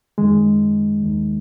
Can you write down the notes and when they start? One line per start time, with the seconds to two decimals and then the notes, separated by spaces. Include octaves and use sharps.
0.18 F#2 D#3 G#3
1.03 D#2 D#3